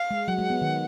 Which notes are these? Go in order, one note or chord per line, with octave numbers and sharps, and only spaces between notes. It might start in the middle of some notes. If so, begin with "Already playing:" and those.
Already playing: F5
G#3
F#3 F#5
G#3
B3
D#3